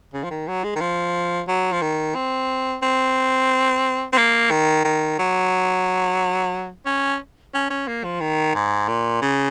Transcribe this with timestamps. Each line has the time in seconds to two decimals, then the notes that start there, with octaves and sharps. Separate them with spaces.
0.14 C#3
0.24 F3
0.30 D#3
0.48 F#3
0.64 G#3
0.76 D#3
0.81 F3
1.48 F#3
1.73 F3
1.82 D#3
2.15 C4
2.83 C4
4.13 C4
4.18 A#3
4.51 D#3
4.85 D#3
5.19 F#3
6.86 C#4
7.54 C#4
7.70 C#4
7.88 A#3
8.04 F3
8.21 D#3
8.55 G#2
8.88 A#2
9.22 C#3